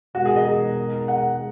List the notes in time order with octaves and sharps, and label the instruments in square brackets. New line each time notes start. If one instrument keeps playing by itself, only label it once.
[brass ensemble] B2 G#3 D#4 A#4 [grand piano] F#4
[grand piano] G#4
D#5
F#5